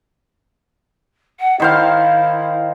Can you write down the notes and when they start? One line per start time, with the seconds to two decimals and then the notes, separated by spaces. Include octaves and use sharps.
1.40 F#5
1.60 D#3 E4 C5 F5